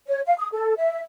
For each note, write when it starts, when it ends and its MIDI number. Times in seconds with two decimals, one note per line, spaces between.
0.08 0.20 73
0.26 0.35 77
0.39 0.48 87
0.52 0.74 69
0.78 1.00 76